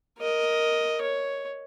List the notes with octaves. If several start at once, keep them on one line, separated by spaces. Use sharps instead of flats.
A#4 D#5
C#5